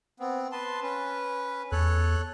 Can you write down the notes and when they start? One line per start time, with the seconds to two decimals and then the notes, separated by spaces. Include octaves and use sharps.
0.20 B3 C4
0.52 B4 A5 C6
0.82 C#4 B4
1.72 E2 A4 C#5 F#6